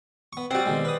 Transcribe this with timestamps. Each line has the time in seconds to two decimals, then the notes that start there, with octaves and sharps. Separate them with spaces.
0.33 B3 C#6
0.51 G3 C4 F#4 F#5
0.65 B2 D#3 G#3
0.85 B4 D#6